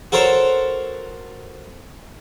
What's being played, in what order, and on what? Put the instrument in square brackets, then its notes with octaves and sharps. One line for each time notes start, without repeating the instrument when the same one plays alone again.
[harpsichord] F#4 A4 A#4 C5 C#5